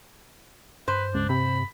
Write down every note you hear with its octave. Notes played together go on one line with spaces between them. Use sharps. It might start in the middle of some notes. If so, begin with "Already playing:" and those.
G2 B4 C5
C#2 D4
C3 B5